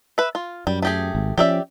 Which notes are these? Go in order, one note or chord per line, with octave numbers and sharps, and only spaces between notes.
B4 E5
F4
F#2 G3
A3 G4 G#4
G#1
F3 C#4 G4 D5 E5